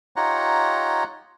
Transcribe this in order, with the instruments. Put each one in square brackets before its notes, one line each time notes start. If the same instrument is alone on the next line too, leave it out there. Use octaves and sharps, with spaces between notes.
[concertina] D#4 F4 G4 C#5 F#5 A#5